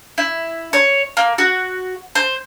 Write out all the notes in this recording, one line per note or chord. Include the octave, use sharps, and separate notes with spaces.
E4
C#5
A#3
F#4
C5